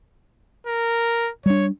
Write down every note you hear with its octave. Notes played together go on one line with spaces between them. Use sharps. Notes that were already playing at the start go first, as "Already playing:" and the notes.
A#4
G3 D4 C#5